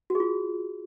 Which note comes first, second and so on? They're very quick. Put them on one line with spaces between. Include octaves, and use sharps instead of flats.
F#4 G#4 F4